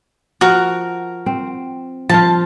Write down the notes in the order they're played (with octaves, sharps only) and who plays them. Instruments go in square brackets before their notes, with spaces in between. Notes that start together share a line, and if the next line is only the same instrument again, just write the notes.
[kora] F3 [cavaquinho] F#4 A#4
[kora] C4
[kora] F3 F4 [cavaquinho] A5